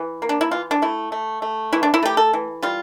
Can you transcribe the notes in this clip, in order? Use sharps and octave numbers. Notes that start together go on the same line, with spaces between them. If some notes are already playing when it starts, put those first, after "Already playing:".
Already playing: E3
A#3
D4
E4
E3 F4
D4
A3 E4
A3
A3
E3 E4
D4
E4
A3 G4
A4
E3
G3 F4